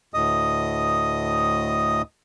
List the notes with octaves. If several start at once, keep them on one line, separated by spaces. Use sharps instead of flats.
D2 A2 D#5 D#6